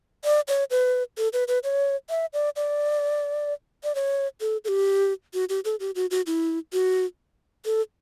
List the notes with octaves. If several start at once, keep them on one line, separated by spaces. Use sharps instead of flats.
D5
C#5
B4
A4
B4
B4
C#5
E5
D5
D5
D5
C#5
A4
A4
G4
F#4
G4
A4
G4
F#4
F#4
E4
F#4
A4